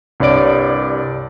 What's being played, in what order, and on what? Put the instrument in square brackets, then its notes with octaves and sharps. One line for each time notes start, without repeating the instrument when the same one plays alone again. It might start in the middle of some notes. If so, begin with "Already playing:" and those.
[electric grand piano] C2 G2 C#5 D5 D7